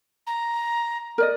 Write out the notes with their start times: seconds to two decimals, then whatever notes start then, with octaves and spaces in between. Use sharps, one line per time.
0.27 A#5
1.18 A#4 D5 D#5